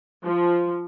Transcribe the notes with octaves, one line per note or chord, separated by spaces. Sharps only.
F3